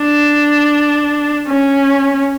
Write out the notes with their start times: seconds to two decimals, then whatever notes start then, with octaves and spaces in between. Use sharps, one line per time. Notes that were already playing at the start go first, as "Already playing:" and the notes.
Already playing: D4
1.48 C#4